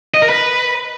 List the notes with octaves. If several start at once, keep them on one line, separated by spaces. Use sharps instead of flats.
D#5
A#4
B4